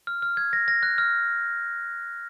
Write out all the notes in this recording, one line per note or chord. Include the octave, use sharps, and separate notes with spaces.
F6
F6
G#6
A#6
A#6
F#6
F6